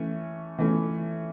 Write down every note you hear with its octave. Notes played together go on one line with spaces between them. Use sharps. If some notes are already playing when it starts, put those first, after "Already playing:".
Already playing: E3 A3 C#4
E3 A3 C#4